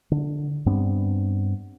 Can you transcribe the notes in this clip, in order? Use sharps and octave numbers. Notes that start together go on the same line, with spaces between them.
D3
G2 B3 C4 D4